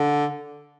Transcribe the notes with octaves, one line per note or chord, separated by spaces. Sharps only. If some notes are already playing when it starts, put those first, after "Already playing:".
Already playing: D3